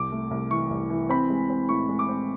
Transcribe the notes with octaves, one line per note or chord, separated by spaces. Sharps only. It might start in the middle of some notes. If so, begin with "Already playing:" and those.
Already playing: C2 D6
A3
C2
E3 C#6
C2
E3
C4 B5
G#3
C4
A2 C#6
G#3
D6
C4